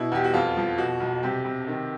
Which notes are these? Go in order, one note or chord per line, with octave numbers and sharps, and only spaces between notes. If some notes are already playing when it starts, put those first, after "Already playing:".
Already playing: B2 E4
E2 G4
F#4
F2 F4
F3
B2 F#4
B1
C3 G4
C3
D#3